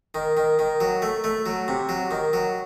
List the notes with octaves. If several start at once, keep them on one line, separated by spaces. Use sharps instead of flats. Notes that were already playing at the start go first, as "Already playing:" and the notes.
D#3
D#3
D#3
F#3
A3
A3
F#3
C3
F#3
D#3
F#3